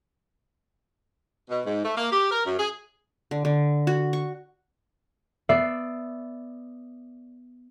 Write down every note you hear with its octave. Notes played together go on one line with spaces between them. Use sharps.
B2
G#2
A3
A#3
G4
A#4
F#2
G#4
D3
D3
F#4
C#6
B3 D5 E5 C7